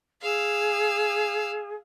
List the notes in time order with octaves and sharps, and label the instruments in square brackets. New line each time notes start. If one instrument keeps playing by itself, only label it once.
[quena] G#4 [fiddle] F5 E6